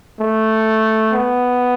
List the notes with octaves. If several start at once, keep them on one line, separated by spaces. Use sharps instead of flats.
A3
B3